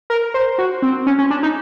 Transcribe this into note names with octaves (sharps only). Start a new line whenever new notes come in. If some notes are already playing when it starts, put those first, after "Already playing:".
A#4
C5
F#4
C4
C#4
C#4
D4
D#4